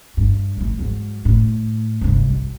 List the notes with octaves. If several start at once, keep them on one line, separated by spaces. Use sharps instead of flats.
G2
A2 E3
G#2 F#3
A2
F1 G2
B1